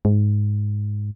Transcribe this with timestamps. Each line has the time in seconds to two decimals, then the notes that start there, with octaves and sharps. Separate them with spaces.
0.05 G#2